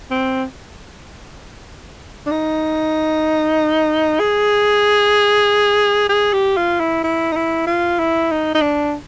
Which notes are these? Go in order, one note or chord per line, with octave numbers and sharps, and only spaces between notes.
C4
D4
D#4
G#4
G#4
G4
F4
E4
E4
D#4
E4
F4
E4
D#4
D#4
D4